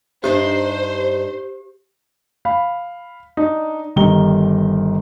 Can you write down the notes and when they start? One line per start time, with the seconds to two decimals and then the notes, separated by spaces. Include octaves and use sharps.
0.24 G2 D4 D#4 G4 C5
2.45 F5 B5
3.37 D4 D#4
3.96 G1 D#3 G3 A#5 G7